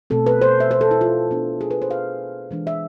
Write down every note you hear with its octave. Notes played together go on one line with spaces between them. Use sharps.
B2 A3 C4 A4
B4
C5
E5
C5
A4
E4
F4
B2 B3 D4
G#4
B4
C5
F5
E3 G#3 D4
E5